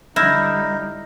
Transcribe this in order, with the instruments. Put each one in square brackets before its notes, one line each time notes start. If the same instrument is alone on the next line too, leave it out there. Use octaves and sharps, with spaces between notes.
[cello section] D3 G3 [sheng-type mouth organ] D#4 [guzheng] E4 [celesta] F6 G6 A#6